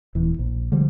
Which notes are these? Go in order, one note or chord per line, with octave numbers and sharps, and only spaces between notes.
D#1 E3
A#1
D3 F3 G3 G#3